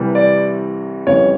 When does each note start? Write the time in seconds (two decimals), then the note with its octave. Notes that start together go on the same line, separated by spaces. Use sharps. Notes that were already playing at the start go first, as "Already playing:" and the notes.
Already playing: C2 C3 E3 G3
0.15 D5
1.07 F2 C#3 E3 G3 C#5